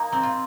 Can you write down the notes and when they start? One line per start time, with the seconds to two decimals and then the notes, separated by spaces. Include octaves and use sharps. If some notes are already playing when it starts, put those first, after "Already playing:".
Already playing: A#3 D#4
0.12 C4
0.23 F4